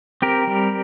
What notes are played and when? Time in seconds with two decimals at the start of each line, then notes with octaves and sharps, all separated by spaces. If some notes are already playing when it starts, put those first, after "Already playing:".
0.22 C4 G4 A#4
0.47 G3